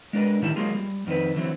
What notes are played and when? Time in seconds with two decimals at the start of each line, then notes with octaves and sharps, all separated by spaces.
0.13 G#3 D4 A#4 B4
0.41 A2 D3 D#3 G3 E4 A5
0.56 F#3 G#3 A#3 F4 G#4
0.75 G3
1.06 F2 D#3 C4 B4
1.35 D3 E3 F#3 C4